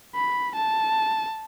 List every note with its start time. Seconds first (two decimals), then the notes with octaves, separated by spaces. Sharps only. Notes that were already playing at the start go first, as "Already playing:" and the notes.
0.16 B5
0.56 A5